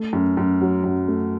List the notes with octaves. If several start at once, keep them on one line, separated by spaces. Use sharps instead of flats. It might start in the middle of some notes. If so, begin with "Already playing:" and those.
Already playing: A3
F#2
F#2
F#3
F#2
A3